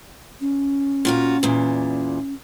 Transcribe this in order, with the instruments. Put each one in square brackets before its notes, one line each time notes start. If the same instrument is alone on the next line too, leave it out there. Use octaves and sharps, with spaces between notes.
[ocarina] C#4
[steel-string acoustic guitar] A#2 F4 F#4
E2 A#2